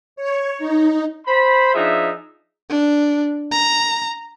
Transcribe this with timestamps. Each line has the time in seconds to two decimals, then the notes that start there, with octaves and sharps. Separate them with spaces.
0.16 C#5
0.59 D#4
1.27 C5 B5
1.74 F3 D4 D#4 G#4 E5
2.69 D4
3.51 A#5